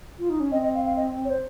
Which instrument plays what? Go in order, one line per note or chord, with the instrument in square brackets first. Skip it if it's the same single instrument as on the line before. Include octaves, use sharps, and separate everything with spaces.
[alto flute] F4
D#4
C#4
[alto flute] C4 [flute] D#5
[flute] D#5
F5
F5
D#5
C#5
C5